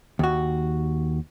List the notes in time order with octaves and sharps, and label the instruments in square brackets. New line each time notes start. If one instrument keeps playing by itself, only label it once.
[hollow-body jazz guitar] D#2 F#4